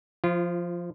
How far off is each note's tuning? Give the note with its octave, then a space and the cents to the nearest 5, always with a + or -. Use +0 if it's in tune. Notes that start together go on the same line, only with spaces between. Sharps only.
F3 +0 F4 -30